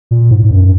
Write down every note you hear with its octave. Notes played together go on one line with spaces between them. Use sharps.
A#2
G#2
G#2
F#2